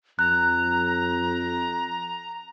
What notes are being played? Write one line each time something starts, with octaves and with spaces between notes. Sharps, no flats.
F2 A#5 F#6